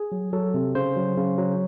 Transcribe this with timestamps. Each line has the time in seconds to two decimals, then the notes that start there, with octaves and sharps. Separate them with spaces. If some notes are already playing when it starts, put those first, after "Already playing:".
Already playing: G#4
0.12 F#3
0.33 F#3 A4
0.54 C3
0.75 C#3 C5
0.97 F#3
1.17 C#3
1.38 F#3